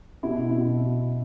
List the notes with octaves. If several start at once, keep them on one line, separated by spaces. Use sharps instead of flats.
B2 E4
B2